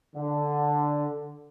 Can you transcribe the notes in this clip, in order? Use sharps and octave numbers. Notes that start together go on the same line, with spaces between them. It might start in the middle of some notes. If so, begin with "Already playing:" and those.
D3